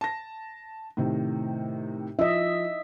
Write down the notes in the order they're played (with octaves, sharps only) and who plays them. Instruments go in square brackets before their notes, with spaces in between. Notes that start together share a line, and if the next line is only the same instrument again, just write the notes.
[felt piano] A5 A#6
A2 C3 D#3
[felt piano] F3 [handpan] D#5 E5